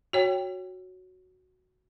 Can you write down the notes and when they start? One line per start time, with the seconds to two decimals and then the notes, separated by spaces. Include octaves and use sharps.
0.13 F#4 C#5 G5